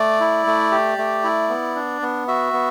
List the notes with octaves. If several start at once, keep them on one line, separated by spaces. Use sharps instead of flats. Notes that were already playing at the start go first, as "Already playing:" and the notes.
Already playing: A3 D5
E4
A3
G4
A3
E4
B3
D4
B3
F#4 E5
B3